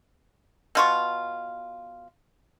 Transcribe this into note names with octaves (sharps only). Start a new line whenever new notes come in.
B2 F4 C#6